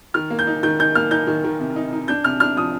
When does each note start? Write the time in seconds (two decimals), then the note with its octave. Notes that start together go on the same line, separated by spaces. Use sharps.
0.14 D#3 F6
0.30 A#3
0.39 G6
0.47 D#4
0.63 D#3 G6
0.79 D#4 G6
0.95 A#3 F6
1.11 D#4 G6
1.27 D#3
1.44 D#3
1.60 C3
1.76 D#4
1.93 D#4
2.08 D4 G6
2.24 C3 F6
2.40 D4 F6
2.57 F3 D#6